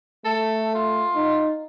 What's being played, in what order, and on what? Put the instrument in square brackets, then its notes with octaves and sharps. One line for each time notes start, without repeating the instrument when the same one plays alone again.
[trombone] A3 [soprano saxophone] A4
[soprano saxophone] F4
[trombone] D#4